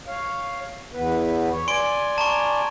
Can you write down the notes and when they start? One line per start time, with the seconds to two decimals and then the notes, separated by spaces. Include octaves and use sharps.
0.07 C#5 F5
0.93 E2 B3 B4
1.51 C#5
1.68 D5 G#5 C6 D7 G7
2.18 A5 A#5 C#6